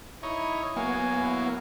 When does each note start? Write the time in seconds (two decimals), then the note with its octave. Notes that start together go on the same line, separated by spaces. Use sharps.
0.23 D#4 E4 C#5
0.76 F#3 A#3 B3 G#5
1.17 E4